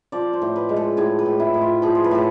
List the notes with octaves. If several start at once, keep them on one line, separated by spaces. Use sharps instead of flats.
F3 D5
C5
A2
B4
G#3
A4
A2 G#4
B4
A2
E4
A2
F4
F3 G#4
C5
B4
A2 A4